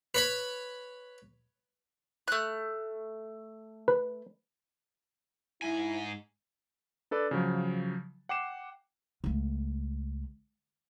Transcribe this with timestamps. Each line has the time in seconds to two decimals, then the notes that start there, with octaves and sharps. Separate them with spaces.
0.15 B4 C#5 B5
2.28 A3 F#6
3.88 B4
5.62 G#2 E4 G#5
7.11 D4 A4 B4 D5
7.31 C#3 F3 F#3
8.29 F#5 G5 D6 C7 E7
9.24 C#2 A3